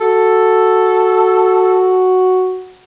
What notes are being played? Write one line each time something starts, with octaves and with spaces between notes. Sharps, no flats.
F#4 A4